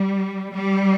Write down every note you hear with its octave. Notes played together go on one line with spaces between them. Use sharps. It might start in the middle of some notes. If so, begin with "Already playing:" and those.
Already playing: G3
G3